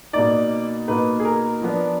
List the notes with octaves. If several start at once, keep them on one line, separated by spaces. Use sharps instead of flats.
B2 A#3 D#4 D5
B2 A#3 D#4 B4
G#4
A#4
F3 B3 D4